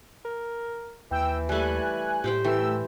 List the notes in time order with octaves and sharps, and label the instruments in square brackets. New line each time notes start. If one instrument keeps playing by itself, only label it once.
[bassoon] A#4
[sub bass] D#2 [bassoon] E3 [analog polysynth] G5 E6
[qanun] G3 A3 [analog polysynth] G#5 F#6
[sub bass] A2 [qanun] G4 C5 G5
[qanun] E3 [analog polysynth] A3 E6 [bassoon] G4